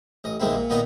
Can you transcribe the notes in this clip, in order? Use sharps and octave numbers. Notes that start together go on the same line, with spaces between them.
A1 D#5
A#1 D#2 G#3 A#3 C4 E4
A#2
A#2 D#3 A#3 B3 D#5 A#5